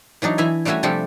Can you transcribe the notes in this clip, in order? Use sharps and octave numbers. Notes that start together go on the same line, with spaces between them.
E3 F#3 D4 D#4
E3 E4 E5 G#5
G3 A3 C#4 F#4 E5 G#5
C3 F3 G3 D4 G4 A4